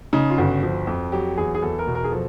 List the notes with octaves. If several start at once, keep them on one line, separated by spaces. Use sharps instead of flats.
C#3 D#4
F4
G1 F#4
F3
F2
F#3 G4
E2 G#4
G#4
E2 A4
A#4
B2
A#4
G#4
F3 A4